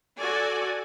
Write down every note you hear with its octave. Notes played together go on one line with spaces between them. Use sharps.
F#4 A4 D5 G#5